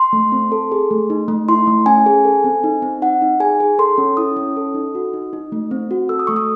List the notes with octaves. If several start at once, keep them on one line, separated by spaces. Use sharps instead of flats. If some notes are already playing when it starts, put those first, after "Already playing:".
Already playing: C6
A3
C4
A4
G#4
A3
D#4
A3
E4 C6
A3
C#4 G#5
G#4
A4
C4
D#4
C4
D#4 F#5
D#4
G#4 G#5
G#4
A4 C6
C#4
E4 D#6
C#4
A4
D#4
F#4
D#4
D#4
A3
C4
F#4
A4 E6
D#6
A3 C#6
D#6